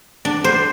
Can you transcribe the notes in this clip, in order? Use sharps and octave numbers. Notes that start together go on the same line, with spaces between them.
D4
C5